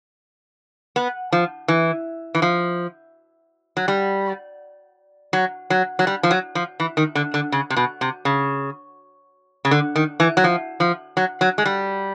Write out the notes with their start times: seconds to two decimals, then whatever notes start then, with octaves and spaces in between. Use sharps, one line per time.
0.96 B3
1.32 F3
1.68 E3
2.35 E3
2.42 F3
3.77 F#3
3.88 G3
5.33 F#3
5.70 F#3
5.99 F#3
6.07 G3
6.23 F3
6.31 F#3
6.55 F3
6.80 E3
6.97 D#3
7.15 D3
7.34 D3
7.52 C#3
7.70 C3
7.76 B2
8.01 C3
8.25 C#3
9.65 C#3
9.71 D3
9.96 D#3
10.20 E3
10.37 F#3
10.44 F3
10.80 F3
11.17 F#3
11.41 F#3
11.58 G#3
11.66 G3